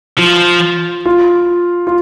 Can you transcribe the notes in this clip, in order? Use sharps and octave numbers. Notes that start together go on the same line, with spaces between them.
F3 F4
F4
F4